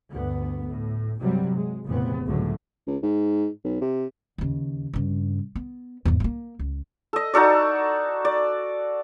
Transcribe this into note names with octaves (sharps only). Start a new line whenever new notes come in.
D2 G2 B3
A2
G2 C3 F#3 G3
G#3
F1 A#2 C#3 E3 B3 C4
C#2 A2 D3 F#3 A3
C#2
G#2
B1
C3
D#2 C#3
G2 C#3
B3
E2 G#2
G#3 A#3
C#2
A4 D#5
D#4 F#4 A4 D5
D5